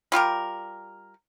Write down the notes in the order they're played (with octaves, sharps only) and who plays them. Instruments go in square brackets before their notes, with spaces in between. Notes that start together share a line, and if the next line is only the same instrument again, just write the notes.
[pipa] G3 F4 G4 A#4